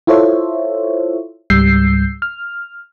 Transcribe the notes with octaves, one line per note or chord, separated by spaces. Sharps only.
E4 F4 A4 C5 C#5 E5
C#2 G#2 G3 E6 G6 C7
F6